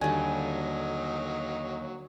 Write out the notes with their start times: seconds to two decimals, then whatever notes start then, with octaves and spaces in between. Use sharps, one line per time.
0.01 D#2 D3 F#3 G3 D#4 G#5